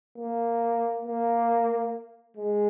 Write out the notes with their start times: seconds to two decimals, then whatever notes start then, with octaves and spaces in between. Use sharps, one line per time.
0.18 A#3
1.05 A#3
2.37 G#3